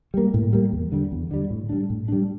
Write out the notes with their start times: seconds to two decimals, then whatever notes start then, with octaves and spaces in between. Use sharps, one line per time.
0.14 G3 A#3
0.34 A2
0.53 G3 A#3
0.72 E2
0.92 D3 G3
1.12 E2
1.31 D3 G3
1.50 A2
1.69 G3 D4
1.90 A2
2.08 G3 D4